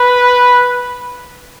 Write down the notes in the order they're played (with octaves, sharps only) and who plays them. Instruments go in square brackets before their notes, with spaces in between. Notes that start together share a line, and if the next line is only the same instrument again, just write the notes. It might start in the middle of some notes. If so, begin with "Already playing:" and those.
Already playing: [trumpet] B4